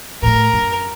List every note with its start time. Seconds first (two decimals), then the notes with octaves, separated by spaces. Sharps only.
0.22 A2 A3 A#4
0.53 F#2